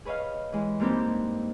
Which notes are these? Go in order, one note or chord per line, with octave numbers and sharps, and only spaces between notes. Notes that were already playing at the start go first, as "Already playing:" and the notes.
G#4 B4 C#5 D#5 F5
E3 G#3
G2 A#3 C4 D#4 G4